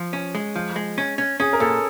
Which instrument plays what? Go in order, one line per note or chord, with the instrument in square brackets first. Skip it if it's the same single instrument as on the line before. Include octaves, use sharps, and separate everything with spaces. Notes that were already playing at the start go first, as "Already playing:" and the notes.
Already playing: [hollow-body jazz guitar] F3
C#4
G#3
F3
G#3
C#4
C#4
[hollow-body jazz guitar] C#4 [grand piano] G#4
[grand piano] A#4
[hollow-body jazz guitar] A#2 [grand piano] A4